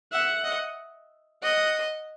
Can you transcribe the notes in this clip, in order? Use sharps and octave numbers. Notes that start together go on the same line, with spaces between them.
E5 F#5
D#5
D#5 F#5